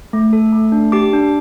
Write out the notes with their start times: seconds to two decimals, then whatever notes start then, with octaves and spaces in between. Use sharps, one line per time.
0.13 A3
0.33 A4
0.52 A3
0.72 D4
0.92 G4 D6
1.13 D4